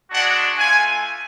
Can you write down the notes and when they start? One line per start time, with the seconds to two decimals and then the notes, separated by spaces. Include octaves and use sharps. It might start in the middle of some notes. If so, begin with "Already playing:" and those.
0.10 G#3 D4 F#4 F#5
0.57 A3 F4 G#5